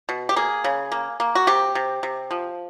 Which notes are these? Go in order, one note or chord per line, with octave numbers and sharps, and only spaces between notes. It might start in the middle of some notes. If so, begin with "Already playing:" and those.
B2
G4
A#3 G#4
C#3
A#3
A#3
F#4
C3 G4
C3
C3
F3